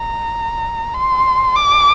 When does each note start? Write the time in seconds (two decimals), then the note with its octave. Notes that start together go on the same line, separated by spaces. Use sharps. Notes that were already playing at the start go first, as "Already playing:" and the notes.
Already playing: A#5
0.94 C6
1.55 D6